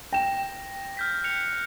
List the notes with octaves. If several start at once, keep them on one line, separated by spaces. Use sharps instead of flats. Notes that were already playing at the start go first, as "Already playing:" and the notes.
G5 A#6 E7
F6 G6 B6
F#6 C#7 F7